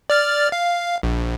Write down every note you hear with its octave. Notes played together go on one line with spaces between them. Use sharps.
D5 F6 A6
F5
A#1